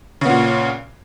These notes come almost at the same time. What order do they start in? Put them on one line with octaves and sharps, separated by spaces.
C#3 B3 A#2